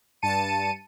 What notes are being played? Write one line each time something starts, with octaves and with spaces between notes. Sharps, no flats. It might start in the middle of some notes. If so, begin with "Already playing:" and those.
G2 A5 C#7 D#7